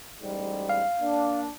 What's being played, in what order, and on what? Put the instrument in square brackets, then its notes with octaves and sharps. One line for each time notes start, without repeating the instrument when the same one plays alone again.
[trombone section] A1 G#2 G3
[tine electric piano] F5
[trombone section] A#3 D4